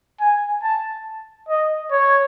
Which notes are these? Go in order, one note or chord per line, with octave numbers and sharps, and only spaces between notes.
G#5
A5
D#5
C#5